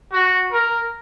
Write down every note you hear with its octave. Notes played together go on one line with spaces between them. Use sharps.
F#4
A#4